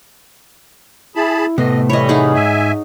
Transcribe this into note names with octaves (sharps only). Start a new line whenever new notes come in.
E4 G#4 A5 B5
A2 C3 A3 B3 D#5
E3 G3 A3 C#5 D#5 B5
D#4 G#4 F#5
G#2 E5 G#5